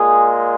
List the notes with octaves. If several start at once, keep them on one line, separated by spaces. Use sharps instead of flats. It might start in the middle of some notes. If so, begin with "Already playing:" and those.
Already playing: A#2 G#3 G#4